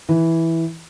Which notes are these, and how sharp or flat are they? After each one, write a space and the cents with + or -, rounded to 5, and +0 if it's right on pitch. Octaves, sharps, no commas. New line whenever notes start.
E3 -5